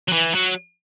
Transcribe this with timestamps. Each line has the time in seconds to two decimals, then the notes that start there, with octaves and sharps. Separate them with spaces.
0.08 F#3
0.12 E3
0.35 F#3